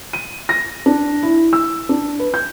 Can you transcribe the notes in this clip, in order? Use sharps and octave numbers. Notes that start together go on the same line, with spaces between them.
D#7
A#6
D4
E4
E6
D4
B4
G6